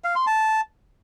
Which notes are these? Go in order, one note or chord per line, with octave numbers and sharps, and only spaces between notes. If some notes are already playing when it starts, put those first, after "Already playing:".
F5
C6
A5